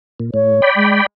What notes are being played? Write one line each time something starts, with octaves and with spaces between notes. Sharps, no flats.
A#2
A2 C#5
D5 G5 B5
G#3